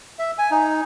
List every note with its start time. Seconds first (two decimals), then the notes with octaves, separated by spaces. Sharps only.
0.19 E5
0.38 G#5
0.51 D#4